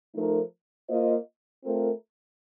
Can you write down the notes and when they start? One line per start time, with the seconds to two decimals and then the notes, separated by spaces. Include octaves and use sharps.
0.14 F3 A3 D#4 A#4
0.89 A#3 F4 C5 D#5
1.64 A3 C4 F4 A#4